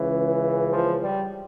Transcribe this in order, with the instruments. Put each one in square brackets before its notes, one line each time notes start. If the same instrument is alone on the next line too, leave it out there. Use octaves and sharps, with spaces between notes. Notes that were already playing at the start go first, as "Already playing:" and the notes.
Already playing: [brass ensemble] C#2 C#3 E3
F3
G3